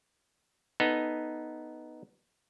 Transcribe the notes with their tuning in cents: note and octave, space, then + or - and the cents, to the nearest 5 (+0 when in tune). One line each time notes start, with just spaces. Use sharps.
B3 +0 D#4 +0 A4 +0